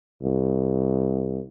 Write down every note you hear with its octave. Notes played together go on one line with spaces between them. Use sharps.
C2